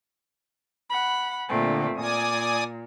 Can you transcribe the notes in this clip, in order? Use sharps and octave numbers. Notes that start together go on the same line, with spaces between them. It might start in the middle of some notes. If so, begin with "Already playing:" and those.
F#5 B5
A#2 D3 A3 C4
A#2 D5 G#5 D#6